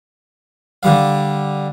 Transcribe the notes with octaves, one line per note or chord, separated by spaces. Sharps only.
D3 G3 F5